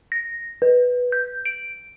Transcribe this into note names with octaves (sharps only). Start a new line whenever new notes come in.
A#6
B4
G6
D7